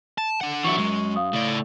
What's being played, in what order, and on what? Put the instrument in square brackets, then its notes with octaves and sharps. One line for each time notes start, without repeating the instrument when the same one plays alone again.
[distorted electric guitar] A5
D4 F#5
[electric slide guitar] E3 F#3 E4 [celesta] C#6 C#7
[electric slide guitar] F#2 [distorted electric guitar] G#3
[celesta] F5 D#6
[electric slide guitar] A2 [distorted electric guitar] C#3 D5